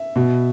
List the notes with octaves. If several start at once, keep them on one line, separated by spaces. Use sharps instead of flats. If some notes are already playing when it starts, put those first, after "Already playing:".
Already playing: E5
B2